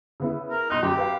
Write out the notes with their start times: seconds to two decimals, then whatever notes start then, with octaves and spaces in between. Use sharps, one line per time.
0.20 C#3 B3 E4
0.51 A#4
0.70 B1 D#4 C6 F#6
0.83 F#2 G4
0.98 B4 F5